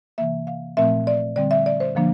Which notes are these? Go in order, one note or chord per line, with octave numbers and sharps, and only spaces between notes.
C3 E3 A#3 E5
F5
A#2 F3 A3 C4 E5
D5
D3 G3 C4 D5
E5
D5
C5
D3 F3 A#3 D4